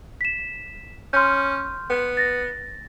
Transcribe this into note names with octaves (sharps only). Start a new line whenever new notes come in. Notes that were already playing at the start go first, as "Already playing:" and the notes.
B6 E7
C#4 C6 F6 G6
B3
A6 A#6